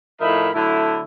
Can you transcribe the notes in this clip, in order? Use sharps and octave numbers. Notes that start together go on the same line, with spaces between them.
A2 F3 D#4 A#4 E5 B5
D3 F#3 A3 E4